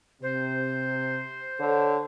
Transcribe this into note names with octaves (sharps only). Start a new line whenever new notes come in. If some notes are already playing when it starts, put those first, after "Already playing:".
C3 C5
D3 A4 C#5